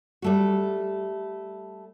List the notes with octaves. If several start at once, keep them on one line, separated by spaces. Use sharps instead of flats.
G3 A3 F#4